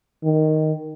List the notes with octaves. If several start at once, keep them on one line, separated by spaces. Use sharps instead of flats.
D#3